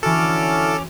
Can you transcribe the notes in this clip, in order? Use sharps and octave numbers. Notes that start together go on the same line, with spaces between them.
D3 E3 C#4 E4 F#4 A4 D6 F6